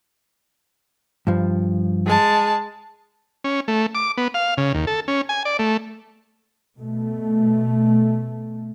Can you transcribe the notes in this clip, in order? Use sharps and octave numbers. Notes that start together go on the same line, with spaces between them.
G2 F3
G#3 A5
C#4
A3
D6
B3
F5
C#3
D#2
A4
C#4
G#5
D5
A3
B2 A3